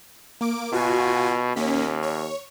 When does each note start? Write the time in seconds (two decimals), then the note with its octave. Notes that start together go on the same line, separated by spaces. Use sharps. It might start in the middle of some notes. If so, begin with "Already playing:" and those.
0.41 A#3 D6 D7
0.73 B2 F4 F#4 G#5
1.56 D#2 A#3 C#4 B6
2.03 C#5